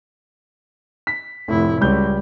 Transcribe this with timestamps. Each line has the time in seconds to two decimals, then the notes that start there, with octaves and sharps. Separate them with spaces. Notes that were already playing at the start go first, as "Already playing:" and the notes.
1.07 B6
1.48 F1 A2 E4
1.81 C#2 G3 G6